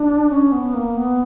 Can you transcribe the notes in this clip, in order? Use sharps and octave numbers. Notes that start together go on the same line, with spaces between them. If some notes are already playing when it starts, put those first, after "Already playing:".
Already playing: D4
C#4
B3
A#3
B3